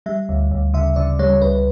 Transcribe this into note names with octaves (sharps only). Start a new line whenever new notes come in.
G3 E5
D2
D2
C#3 E5
C#3 D5
G3 C#5
C#2 B4